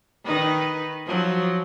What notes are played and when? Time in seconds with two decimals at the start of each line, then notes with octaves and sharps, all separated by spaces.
0.25 D#3 D#4 B4
1.06 F3 F#3